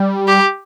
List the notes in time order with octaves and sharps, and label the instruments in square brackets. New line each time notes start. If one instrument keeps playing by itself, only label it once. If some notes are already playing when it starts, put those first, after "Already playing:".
Already playing: [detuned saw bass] G3
[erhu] G4